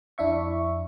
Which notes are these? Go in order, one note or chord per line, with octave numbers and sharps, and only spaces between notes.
F2 D4 E4 E5 C#6